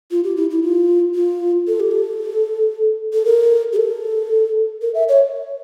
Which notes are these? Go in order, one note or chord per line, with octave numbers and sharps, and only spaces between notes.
F4
G4
E4
E4
F4
F4
A4
G4
A4
A4
A#4
G4
A4
A#4
E5
C#5